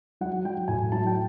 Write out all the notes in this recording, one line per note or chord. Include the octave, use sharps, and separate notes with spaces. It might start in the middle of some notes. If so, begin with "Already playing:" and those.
F#3 F#5
F#3 G5
A2 G#5
F#3 A5
G5